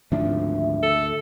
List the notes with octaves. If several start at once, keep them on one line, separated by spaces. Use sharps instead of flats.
D2 G#2 D#3 F3 C4 D4 E5
A4